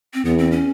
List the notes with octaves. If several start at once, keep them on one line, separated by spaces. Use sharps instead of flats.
C4
E2 B3
C4
C#4